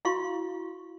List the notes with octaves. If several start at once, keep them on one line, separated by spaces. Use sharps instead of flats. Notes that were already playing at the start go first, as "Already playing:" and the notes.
E4 F#4 F5 C6 C#6